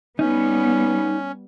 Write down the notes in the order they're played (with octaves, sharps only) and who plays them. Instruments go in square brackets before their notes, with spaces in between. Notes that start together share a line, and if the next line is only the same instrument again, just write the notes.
[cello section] G3 B3 [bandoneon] C#4 [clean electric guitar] D#4